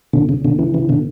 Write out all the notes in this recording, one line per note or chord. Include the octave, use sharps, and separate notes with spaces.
B2 D3
C#3
B2 D3
C#3 E3
C#3 E3
B2 D3